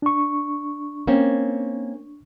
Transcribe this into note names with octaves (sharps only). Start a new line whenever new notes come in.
D4 C#6
A#3 C4 C#4